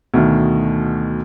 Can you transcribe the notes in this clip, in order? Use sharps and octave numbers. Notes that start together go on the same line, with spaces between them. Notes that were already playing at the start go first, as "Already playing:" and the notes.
D2 B2 D#3